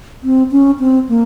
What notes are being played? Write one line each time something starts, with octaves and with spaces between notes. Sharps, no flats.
C4
C#4
C4
A#3